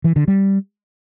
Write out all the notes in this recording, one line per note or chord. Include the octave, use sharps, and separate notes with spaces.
E3
D3
G3